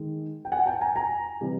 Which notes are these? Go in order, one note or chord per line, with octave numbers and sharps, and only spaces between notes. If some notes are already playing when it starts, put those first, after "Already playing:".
Already playing: D#3 G#3
G5
F#5 G#5
G5 A5
G#5 A#5
G#5 A#5
C3 E3 G3